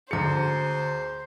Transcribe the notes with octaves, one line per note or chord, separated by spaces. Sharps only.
D2 G#4 C5 A#5 C#7